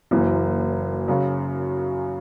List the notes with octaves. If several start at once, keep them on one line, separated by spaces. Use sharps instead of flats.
F#1 F#2 E3 A#3
F#2 C#3 F#3